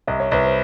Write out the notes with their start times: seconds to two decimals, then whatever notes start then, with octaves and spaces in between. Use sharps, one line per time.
0.07 C2 D#5
0.20 C#5
0.31 C2 B4
0.44 C5